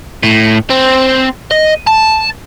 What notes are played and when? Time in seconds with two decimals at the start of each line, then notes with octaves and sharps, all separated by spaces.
0.23 A2
0.70 C4
1.51 D#5
1.87 A5